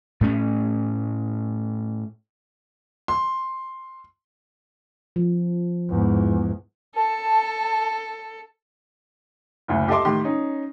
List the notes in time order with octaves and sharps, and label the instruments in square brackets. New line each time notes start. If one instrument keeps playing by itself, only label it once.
[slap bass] A2 A3 C#4
[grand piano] C6
[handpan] F3
[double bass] E2 G#2
[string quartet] A4 [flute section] A5
[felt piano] F#1 D2
G4 A4 D#5 E5 C6 D6
A2 D#3 G4 C6
C#4 D#4